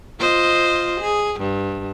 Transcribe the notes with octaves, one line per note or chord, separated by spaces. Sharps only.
F4 C5 D#5
G#4
G2